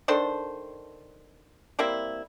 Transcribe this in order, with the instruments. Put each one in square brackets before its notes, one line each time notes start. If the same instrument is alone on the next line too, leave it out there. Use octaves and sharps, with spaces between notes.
[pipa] D#3 D4 A4 C5
G3 A#3 C4 E4